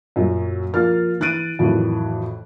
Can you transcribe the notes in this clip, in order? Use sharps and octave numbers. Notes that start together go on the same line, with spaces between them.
F#2 A#2 F#3
F3 A#3 F4 F6 A6
E3 F#6 A6 D7 D#7
F2 A2 D#3 E3 F#3